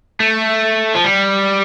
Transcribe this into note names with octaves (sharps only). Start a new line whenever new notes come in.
A3
F3
G3